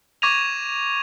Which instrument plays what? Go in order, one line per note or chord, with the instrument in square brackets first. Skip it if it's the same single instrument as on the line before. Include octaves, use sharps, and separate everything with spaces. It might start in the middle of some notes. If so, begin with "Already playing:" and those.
[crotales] C#6 D6 G#6 A#6 D#7 F7